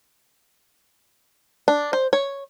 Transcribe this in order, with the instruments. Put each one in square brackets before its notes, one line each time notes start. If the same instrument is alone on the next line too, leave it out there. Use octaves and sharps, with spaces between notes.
[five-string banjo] D4
C5
C#5